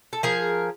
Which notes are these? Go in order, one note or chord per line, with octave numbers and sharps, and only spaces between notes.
A4
F3 G#4 A#4